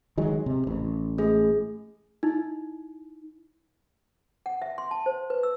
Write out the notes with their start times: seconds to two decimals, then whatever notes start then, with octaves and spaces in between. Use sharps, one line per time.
0.18 D#3 F#3 G#3
0.46 C3
0.67 A1
1.18 A3 G#4
2.23 D#4 E4
4.46 F#5
4.62 E5
4.78 C6
4.91 A5
5.06 C5
5.30 B4
5.43 E6